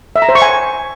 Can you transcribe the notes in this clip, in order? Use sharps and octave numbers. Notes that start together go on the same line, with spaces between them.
E5
A#5
C5
C#6
G#5